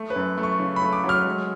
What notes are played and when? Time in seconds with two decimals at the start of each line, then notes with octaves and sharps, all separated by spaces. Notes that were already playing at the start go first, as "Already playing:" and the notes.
Already playing: A3
0.10 B4
0.16 F#2
0.38 A3
0.43 C#6
0.60 C#3
0.76 B5
0.82 A3
0.93 D6
1.04 F#3
1.09 F6
1.26 G#3